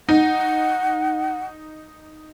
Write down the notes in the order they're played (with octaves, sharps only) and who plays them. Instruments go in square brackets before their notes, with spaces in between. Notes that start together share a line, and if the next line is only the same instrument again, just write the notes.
[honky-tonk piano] D#4 [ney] F#5